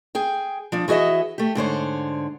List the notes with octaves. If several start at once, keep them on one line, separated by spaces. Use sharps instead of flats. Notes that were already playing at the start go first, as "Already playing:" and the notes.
G#4 G5
F3 D4
E3 F#4 G#4 D#5 E5
A3 G4
G#2 D3 C5 C#5